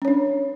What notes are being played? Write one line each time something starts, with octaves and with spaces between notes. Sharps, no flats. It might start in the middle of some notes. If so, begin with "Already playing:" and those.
C#4 D4 C#5